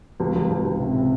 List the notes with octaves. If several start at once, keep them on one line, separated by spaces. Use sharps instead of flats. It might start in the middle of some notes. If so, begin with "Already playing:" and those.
C#2
C#2
C#2
C#2
C3
C3